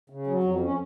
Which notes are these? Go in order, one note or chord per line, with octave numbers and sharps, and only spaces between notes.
C#3
F#3
F2
C#4